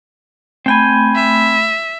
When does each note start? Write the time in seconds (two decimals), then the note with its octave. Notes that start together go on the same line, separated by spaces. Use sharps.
0.66 A3 C4 G5 G#5 B5
1.15 E5